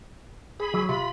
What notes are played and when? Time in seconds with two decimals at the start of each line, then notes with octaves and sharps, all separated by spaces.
0.60 G#4 B5
0.74 F#3
0.89 C3 F4 B5